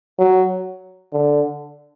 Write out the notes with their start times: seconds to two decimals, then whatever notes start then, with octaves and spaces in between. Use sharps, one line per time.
0.19 F#3
1.13 D3